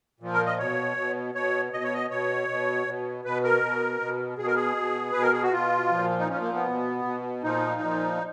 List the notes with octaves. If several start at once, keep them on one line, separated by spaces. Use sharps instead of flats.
A#2 F3
A#4
D#5
B2 C#5
B2
B2 C#5
B2 D#5
C#5
D#5
B2 C#5
B2
B2
B2 B4
A#4
B2
B2
B2 G#4
A#4
G#4
B2
B2 B4
A#4
G#4
F#4
B2 F4
A#2 F3
D#4
A#2 F3 C#4
A#3
B3
B2
B2
A#2 F3 D#4
A#2 F3